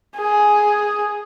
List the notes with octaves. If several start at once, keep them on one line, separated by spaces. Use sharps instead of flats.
G#4